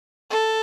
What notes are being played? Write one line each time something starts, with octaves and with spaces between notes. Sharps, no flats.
A4